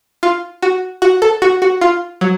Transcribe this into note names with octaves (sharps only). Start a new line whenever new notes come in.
F4
F#4
F#4
A4
F#4
F#4
F4
F#3